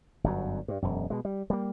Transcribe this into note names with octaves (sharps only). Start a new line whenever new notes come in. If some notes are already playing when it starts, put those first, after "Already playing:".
G1 F#2 F#3
G2
E1 F#2
B2 G#3
G3
G3 A#3